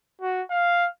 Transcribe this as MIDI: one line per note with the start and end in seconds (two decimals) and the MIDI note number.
0.22 0.42 66
0.51 0.88 77